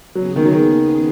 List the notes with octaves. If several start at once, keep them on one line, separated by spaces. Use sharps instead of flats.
D#2 C#3 F#3 B3 G#4
D#3
F#3
D#3